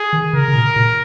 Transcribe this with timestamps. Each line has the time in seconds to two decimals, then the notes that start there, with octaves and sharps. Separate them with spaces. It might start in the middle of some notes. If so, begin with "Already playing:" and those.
Already playing: G#4
0.13 D#3
0.33 C#3 A#4
0.48 C#3
0.55 A#2
0.76 A#2